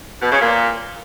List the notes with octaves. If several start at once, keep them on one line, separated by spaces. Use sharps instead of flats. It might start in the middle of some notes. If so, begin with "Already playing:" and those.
B2
C#3
A#2